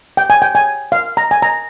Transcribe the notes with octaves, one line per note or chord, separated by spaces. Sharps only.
G5
G#5
G5
G#5
F5
A#5
G#5
A#5